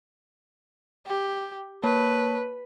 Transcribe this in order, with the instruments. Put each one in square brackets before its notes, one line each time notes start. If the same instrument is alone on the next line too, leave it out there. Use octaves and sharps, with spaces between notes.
[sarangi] G4
[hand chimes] A#3 C#5 A5 [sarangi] B4